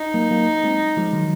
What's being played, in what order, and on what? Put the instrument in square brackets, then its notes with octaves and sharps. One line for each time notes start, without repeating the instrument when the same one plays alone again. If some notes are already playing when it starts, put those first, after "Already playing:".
Already playing: [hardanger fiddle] D#4
[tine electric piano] F#3 A#3
F#3 A#3
G#3 C4
F3 G#3
D#3 F#3